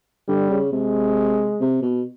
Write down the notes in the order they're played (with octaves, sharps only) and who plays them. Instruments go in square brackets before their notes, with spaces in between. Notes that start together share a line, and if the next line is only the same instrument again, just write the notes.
[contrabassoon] D3 [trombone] G3
[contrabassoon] C#3
[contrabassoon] C3 [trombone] G#3
[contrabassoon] C3
B2